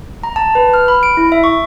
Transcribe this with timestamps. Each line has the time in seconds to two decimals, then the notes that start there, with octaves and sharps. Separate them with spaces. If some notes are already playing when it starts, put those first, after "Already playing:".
0.23 A#5
0.36 A5
0.55 B4
0.74 F6
0.88 B5
1.03 D7
1.17 E4
1.32 E5
1.44 C#6